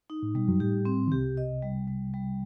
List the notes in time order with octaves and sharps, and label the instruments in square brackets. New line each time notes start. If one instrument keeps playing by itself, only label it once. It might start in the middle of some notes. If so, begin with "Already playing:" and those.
[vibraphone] D#4
[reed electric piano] A2
[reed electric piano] B2 [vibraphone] G3
[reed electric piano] F#2 F#3
[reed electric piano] A2 [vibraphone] G4
[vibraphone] C4
[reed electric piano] D#3
[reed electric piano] C2 C3 [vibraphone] G4
[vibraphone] D#5
G3
G3
G3